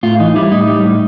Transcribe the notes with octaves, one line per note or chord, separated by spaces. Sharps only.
A2 F4
E3 D#4
G3 E4
A2 D#4
G3
A2